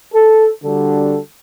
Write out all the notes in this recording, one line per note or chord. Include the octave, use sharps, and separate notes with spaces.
A4
D3 G3 D4 F#4 A4